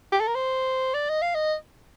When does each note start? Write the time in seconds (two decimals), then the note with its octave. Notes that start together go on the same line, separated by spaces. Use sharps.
0.12 G4
0.20 A4
0.27 A#4
0.35 C5
0.94 D5
1.09 D#5
1.22 F5
1.35 D#5